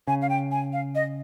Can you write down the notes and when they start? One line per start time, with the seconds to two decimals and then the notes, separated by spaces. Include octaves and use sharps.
0.07 C#3 G#5
0.22 F5
0.29 G5
0.51 G#5
0.73 F5
0.95 D#5